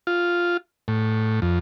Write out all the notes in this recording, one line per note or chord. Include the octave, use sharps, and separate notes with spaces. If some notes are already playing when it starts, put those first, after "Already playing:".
F4
A2
F2